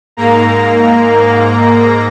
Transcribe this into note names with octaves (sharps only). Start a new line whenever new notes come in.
G#2 A#3 A#5